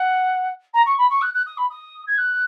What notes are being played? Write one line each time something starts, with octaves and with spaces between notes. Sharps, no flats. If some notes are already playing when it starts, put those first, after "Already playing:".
Already playing: F#5
A#5
C#6
B5
C#6
F#6
F#6
D#6
B5
D#6
G#6
F#6